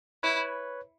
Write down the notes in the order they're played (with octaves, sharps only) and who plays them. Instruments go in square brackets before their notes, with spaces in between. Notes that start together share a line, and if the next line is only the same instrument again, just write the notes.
[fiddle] E4 [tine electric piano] B4 C#5